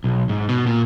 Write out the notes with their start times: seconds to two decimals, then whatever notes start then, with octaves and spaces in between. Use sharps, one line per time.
0.04 B1
0.29 G#2
0.49 B2
0.67 A#2